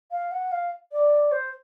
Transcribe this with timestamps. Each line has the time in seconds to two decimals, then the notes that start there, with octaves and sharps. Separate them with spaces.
0.11 F5
0.31 F#5
0.51 F5
0.92 D5
1.31 C5